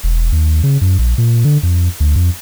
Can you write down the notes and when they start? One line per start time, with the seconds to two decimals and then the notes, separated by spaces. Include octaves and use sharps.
0.04 E1
0.32 D#2
0.63 C#3
0.81 F#2
0.99 A#1
1.18 A#2
1.44 D3
1.63 F2
2.00 D2
2.16 F2